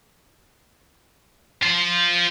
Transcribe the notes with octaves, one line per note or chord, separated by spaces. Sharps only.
F4 C5